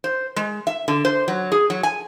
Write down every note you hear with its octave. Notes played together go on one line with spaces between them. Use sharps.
C5
G#3
E5
D3
C5
F#3
G#4
F#3
G#5